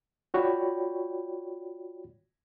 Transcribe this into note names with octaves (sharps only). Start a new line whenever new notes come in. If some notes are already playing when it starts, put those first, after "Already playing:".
F4 F#4 C#5 D5 G5 B5